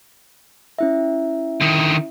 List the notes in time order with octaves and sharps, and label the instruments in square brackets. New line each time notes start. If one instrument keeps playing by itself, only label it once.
[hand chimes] C#4 E4 E5
[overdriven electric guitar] D3 D#3